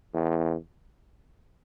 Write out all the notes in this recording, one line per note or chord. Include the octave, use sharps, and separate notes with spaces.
E2